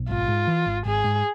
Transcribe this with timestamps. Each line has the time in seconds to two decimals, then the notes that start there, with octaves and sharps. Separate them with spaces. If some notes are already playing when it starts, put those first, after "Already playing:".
Already playing: B1
0.09 G#1 F4
0.28 G#2
0.47 E3
0.66 G#1
0.85 G#1 G#4
1.04 G#2